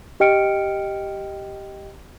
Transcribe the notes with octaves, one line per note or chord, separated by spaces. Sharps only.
G4 D#5 G5 F6 C#7 D7